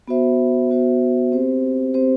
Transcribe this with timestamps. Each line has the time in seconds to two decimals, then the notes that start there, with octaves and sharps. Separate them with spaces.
0.08 B3 F#4 C5 E5
0.70 B3 F#4 C5 E5
1.32 C4 G4 C5
1.94 C4 G4 C5